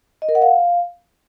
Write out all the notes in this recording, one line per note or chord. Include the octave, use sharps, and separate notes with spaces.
D#5
A#4
F#5
F5